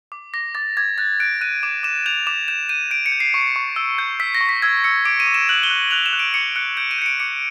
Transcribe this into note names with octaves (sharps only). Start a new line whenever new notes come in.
D6
D6 A#6
D6 A6
D6 G#6
F#6 A6
F#6 D7
F#6 D#7
D6 E7
D6 E7
G6 F7
D6 E7
G6 E7
G6 D#7
G6 D7
C#7
G6
C7
C#6
C#6
E6
G6
E6 B6
A#6
C#6
B6
E6 G#6
E6 C#7
D6 D7
D#7
D6
E7
F#6 F#7
G7
F#6
F#6 F7
E7
F#6
D7
D6 C#7
F#6 C#7
G6 D7
D#7
G6 C#7
D7
D6 C#7